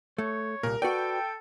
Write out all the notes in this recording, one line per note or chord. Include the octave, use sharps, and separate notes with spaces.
A3 C#5
C2 A#2 A#4
F#4 A4 B4 D5 G5